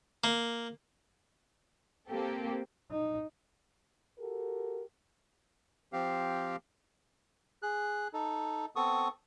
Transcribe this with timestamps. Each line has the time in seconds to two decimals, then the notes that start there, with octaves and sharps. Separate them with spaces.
0.24 A#3
2.07 A#3 C4 G4 A4
2.91 D#4
4.19 F#4 G4 A4 A#4
5.93 F3 C4 G4 F5
7.63 G#4 F#6
8.13 D#4 A4
8.76 B3 C4 A4 C#6 D#6